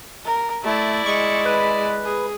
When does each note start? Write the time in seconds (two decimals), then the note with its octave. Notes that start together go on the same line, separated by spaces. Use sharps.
0.25 A#4
0.64 A3 E4 D5
1.06 G#3 C#6
1.45 B4
2.05 G#4